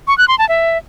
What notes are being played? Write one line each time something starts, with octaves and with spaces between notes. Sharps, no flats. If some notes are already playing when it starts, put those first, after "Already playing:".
C#6
F#6
C6
A5
E5